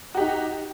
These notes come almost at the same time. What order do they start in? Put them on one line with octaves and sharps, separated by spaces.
F#4 G4 D#4